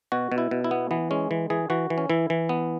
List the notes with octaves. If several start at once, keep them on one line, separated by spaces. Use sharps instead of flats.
B2 F#4
B2
E4
B2
E4
B3
E3 B3
G#3 C#4
E3
E3 G#4
E3 F#4
E3
C#4
E3 E4
E3
B3